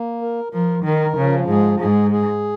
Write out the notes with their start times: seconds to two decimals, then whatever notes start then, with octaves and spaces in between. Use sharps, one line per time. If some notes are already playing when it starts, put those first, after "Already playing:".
Already playing: A#3
0.22 A#4
0.53 F3 A#4
0.84 D#3 A#4
1.16 C#3 F3
1.47 G#2 G#4
1.80 G#2 G#4
2.11 G#4